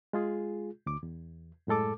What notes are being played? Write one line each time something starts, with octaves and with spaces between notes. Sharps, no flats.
G#3 F4 G#4
D2 D6
E2
F#2 A2 G#3 A4 D6